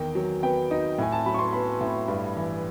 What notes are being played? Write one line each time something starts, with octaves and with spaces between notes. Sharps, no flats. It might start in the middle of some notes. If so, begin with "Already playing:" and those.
Already playing: E2 D#3 G5
F#3
B3 G5
D#4
A2 G#5
A5
F#3 B5
C#6
C6
B3 B5
A2
G2
E3